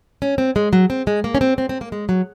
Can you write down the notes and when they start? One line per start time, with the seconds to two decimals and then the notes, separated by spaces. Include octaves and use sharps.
0.22 C#4
0.38 C4
0.56 G#3
0.73 F#3
0.90 C4
1.07 G#3
1.24 A#3
1.35 C#4
1.41 C4
1.58 C4
1.69 C4
1.81 A#3
1.92 G#3
2.09 F#3